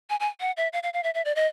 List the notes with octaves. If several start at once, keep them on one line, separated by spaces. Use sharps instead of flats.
G#5
G#5
F#5
E5
F5
F5
F5
E5
E5
D5
D#5